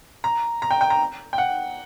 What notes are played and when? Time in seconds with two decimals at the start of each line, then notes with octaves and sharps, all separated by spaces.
0.24 A#5
0.62 A#5
0.71 G5
0.81 G5
0.90 A#5
1.33 G5
1.38 F#5